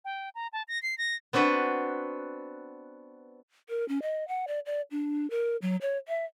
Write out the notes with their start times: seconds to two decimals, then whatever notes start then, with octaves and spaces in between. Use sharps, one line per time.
0.05 G5
0.35 A#5
0.53 A5
0.68 A#6
0.83 C7
0.98 A#6
1.33 B3 C4 D4 F#4 B4
3.69 A#4
3.88 C#4
4.02 D#5
4.28 F#5
4.48 D5
4.66 D5
4.91 D4
5.30 A#4
5.62 F#3
5.81 C#5
6.08 E5